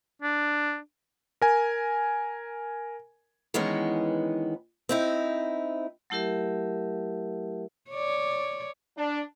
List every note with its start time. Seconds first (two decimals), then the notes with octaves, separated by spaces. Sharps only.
0.22 D4
1.42 A#4 G#5
3.54 D#3 E3 G#3 B3 C#4
4.89 C4 D#4 E4
6.10 F#3 A3 E4 G4 A#4 E5
7.90 C#5 D5
8.97 D4